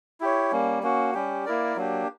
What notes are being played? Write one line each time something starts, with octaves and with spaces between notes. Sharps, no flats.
E4 G4 C#5
G3 A#3 C#4
A#3 C#4 F#4
G3 C#4 G4
A#3 E4 A#4 D5
F#3 A#3 D4 G4